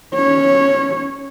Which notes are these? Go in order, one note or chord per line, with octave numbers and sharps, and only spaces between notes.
C#4 C#5